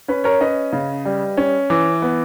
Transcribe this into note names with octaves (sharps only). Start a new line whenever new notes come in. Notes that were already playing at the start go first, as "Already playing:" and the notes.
C#4 B4
A#4 C#5
C#4 B4 D#5
C#3
G3
C#4
E3
B3